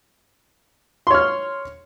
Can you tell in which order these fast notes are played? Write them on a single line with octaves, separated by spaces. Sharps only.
C6 C#5 F6